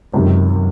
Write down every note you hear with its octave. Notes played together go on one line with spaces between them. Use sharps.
C#2 F#2 C3 D#3